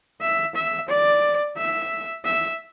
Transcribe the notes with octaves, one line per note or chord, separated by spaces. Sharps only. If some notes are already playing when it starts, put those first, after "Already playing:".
E5
E5
D5
E5
E5